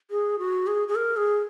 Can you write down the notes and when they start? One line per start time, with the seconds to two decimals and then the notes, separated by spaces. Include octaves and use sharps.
0.11 G#4
0.39 F#4
0.67 G#4
0.88 G#4
0.95 A#4
1.17 G#4